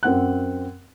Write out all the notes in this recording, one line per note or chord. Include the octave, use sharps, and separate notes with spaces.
F#2 C4 F#5 F#6